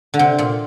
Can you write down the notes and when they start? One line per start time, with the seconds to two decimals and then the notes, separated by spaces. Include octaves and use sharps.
0.14 D3
0.19 C3
0.38 A#2